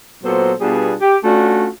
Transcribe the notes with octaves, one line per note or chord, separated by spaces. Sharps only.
A#2 F#3 B3 A4 C5
B2 G3 B3 D4 F4 G#4
G4
A3 C#4 D4 F4 F#4